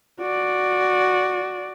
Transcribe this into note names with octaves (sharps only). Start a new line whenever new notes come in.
F#4 D5